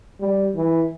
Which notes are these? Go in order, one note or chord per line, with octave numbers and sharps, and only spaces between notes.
G3
E3